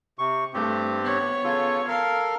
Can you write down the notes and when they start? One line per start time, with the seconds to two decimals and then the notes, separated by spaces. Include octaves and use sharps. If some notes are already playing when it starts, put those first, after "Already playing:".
0.18 C3 C#6
0.54 G2 A3 C4 G4
1.01 B3 C#5
1.44 C#3 F4 A4
1.88 A4 A#4 F5